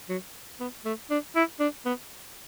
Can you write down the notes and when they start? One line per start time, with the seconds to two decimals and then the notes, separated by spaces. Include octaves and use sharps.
0.09 F#3
0.60 B3
0.85 A3
1.10 D4
1.35 E4
1.60 D4
1.85 B3